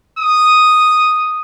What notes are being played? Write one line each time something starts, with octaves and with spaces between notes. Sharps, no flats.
D#6